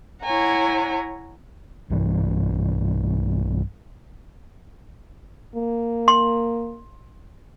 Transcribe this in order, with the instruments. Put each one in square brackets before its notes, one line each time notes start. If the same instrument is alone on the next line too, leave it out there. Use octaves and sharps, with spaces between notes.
[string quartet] E4 C#5 F#5 G#5 A#5
[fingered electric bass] B1 G2 E3
[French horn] A#3
[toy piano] C6